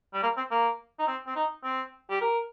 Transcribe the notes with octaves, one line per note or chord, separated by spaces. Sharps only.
G3
A#3
C4
A#3
D#4
C4
C4
D#4
C4
G4
A#4